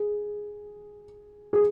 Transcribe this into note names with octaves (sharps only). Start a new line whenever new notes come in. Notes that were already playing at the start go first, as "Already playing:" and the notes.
Already playing: G#4
G#4